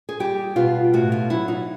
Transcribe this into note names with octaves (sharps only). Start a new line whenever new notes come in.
G#4
G3 G4
B2 F4
A2 F#4
F4
F#3 E4
D#4